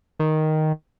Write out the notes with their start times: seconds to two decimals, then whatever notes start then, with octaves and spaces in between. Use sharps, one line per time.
0.19 D#3